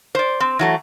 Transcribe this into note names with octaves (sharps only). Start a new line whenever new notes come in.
C5 D5
C4
E3 F#3 A3